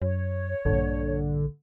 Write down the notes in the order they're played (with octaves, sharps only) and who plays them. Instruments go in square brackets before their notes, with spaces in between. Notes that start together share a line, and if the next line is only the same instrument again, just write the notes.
[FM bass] F#2 [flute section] C#5
[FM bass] A#1 [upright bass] G2 A#2 [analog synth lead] D3